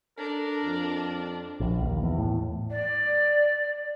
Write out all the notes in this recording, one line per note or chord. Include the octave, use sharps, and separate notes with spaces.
D4 A4 A#4
F2
A#1
D#2
E2
A2
D5